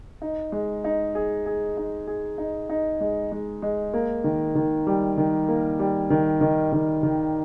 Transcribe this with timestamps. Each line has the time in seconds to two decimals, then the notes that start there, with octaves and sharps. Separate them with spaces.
0.22 D#4
0.52 G#3
0.84 D#4
1.15 G#4
1.46 G#4
1.77 D#4
2.07 G#4
2.38 D#4
2.69 D#4
3.01 G#3
3.32 G#3
3.62 G#3
3.94 A#3
4.24 D#3
4.55 D#3
4.87 G3
5.17 D#3
5.48 A#3
5.79 G3
6.10 D#3
6.41 D#3
6.72 D#3
7.03 D#3